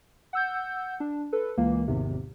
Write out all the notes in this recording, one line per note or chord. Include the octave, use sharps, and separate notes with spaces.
F#5 E6 G6
D4
A4 B4
C#2 E3 A#3
G#1 E2 G#2 C3